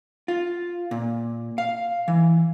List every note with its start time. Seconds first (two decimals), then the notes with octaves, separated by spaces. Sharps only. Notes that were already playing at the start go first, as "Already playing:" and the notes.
0.28 F4
0.91 A#2
1.58 F5
2.08 E3